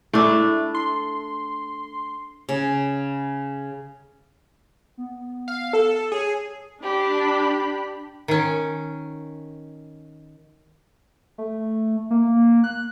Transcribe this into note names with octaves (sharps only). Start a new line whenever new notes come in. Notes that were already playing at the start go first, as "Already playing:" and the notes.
A3 D4 E4
C6
C#3
B3
F5
A4
G#4 C#5
D4 G4 B5
D#3 C#4
A3
A#3
F#6